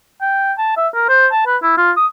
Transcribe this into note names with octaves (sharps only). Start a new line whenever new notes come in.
G5
A5
E5
A#4
C5
A5
B4
E4
F4
D#6